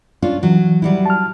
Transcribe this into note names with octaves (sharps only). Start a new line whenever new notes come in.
C#4 D4 F4
E3 F#3
F#3 G3 E4
A5 F6